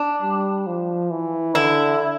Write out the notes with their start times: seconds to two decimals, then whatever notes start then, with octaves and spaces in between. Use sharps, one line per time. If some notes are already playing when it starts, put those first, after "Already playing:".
Already playing: D4
0.22 G3
0.67 F3
1.11 E3
1.55 D3 E4